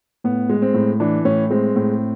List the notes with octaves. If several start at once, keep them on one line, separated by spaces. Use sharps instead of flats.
A2 B3
G#3
C4
A2
E3 D4
A2 C#4
G#3 C4
A2